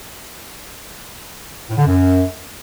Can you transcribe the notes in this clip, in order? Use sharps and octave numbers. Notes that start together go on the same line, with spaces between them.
A2
D3
F#2